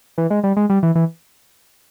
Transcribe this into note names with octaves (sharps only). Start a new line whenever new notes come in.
E3
G#3
G3
G#3
G3
E3
E3